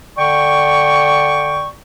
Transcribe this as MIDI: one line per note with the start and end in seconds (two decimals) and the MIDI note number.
0.18 1.69 50
0.18 1.69 74
0.18 1.69 79
0.18 1.69 85